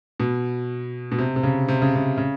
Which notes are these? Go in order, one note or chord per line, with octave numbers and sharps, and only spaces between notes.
B2
B2
C3
C3
C#3
C3
C#3
C3
C#3